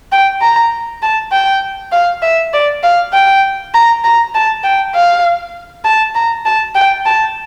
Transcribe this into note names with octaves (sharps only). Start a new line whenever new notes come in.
G5
A#5
A5
G5
F5
E5
D5
F5
G5
A#5
A#5
A5
G5
F5
A5
A#5
A5
G5
A5